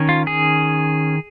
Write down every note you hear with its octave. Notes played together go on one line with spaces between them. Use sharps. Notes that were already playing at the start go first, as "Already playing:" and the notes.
Already playing: D#3 C#4
F4
G#4